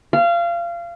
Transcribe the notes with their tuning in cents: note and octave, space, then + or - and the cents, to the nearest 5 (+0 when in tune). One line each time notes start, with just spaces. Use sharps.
F5 -25